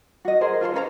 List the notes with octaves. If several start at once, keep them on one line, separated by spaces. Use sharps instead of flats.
F#4 D#5
G#4 A#4 C5
F4 G#4 A4 C5
C#4 B4 A#5